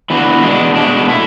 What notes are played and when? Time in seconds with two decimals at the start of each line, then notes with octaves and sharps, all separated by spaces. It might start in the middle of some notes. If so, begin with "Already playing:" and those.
0.10 E3 B3 D4 F#4
0.43 B2 G#3 D4
0.76 B2 G#3 D4
1.09 A3 E4